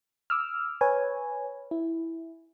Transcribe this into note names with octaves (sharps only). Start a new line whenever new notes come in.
D6 E6 F6
B4 C#5 G#5
E4